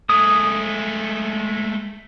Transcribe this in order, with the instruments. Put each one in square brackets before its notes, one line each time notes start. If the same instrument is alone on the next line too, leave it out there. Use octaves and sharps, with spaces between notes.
[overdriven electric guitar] G#3 A3 [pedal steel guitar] D#6